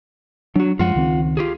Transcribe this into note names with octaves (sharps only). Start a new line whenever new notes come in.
F#3 D4 F#4
F#2 F3 G#3 F4 F#5
C#2 D#3 C4
F4 G4 G#4